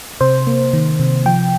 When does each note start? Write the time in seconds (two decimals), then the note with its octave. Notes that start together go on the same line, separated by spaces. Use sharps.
0.21 C3 C5
0.47 A#3
0.73 D#3
0.99 C3
1.26 F3 G5